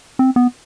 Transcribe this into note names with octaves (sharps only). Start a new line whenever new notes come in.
C4
B3